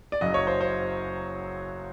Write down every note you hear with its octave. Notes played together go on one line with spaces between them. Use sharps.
D5
F#1 F#2 C#3 F#3 D#5
C#5
C5
C5